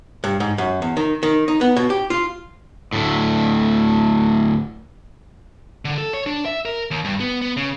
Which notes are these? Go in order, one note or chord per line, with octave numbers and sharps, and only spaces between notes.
G2
G#2
F#2
E2
D#3
D#3
D#4
B3
B2
G4
F4
D2 A2
D3
A4
C#5
D4
E5
A#4
D#2
G2
B3
B3
C#3